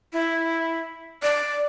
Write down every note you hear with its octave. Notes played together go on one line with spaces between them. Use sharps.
E4
D5